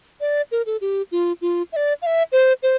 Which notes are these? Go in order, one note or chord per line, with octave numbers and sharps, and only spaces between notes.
D5
A#4
A4
G4
F4
F4
E5
D5
F5
E5
C5
C5